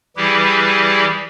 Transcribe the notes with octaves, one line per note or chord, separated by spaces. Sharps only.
E3 G3 E4 G4 G#4 B4